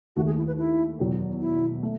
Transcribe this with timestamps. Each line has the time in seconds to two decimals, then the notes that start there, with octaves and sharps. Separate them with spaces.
0.16 D#2 D#3 A3 F#4
0.26 G#4
0.37 E4
0.47 B4
0.58 E4
0.99 E2 B2 F#3
1.40 E4
1.83 A3